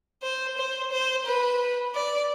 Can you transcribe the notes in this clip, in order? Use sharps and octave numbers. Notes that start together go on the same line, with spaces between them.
C5
C5
C5
B4
D5